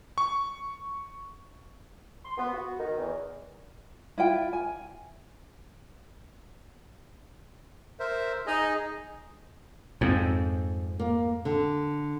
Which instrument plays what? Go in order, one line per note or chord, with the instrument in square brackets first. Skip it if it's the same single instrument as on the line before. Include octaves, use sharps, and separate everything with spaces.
[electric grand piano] C#6
[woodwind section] C6
B3
F#4
D#3
E2
[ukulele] E4 F4 G5
G#5
[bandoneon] A#4 C5 E5
[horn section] D#4 [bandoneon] G#4 D#5
[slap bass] F2 G#2 [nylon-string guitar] C4
[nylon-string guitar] A#3
D3